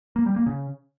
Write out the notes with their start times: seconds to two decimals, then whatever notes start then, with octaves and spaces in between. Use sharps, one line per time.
0.16 A#3
0.26 G3
0.36 A#3
0.46 C#3